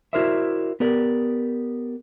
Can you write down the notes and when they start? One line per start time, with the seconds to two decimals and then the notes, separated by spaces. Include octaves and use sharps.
0.13 E4 F#4 A#4 C5 D5 E5
0.80 B3 G4 A#4 D5